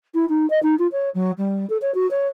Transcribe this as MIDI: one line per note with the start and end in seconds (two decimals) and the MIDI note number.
0.15 0.26 64
0.29 0.48 63
0.50 0.62 75
0.63 0.75 63
0.79 0.87 65
0.92 1.10 73
1.15 1.31 54
1.38 1.68 55
1.70 1.78 69
1.82 1.92 73
1.95 2.09 66
2.11 2.28 73